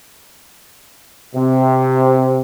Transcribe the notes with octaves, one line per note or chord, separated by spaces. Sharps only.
C3